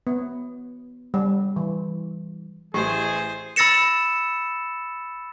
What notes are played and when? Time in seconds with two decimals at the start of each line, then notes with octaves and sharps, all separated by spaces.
0.07 B3
1.14 G3
1.56 E3
2.74 A1 A2 G4 G#4 C5
3.56 B5 E6 A6 A#6 C#7 E7